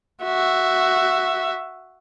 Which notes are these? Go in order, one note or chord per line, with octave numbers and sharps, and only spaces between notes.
F#4 E5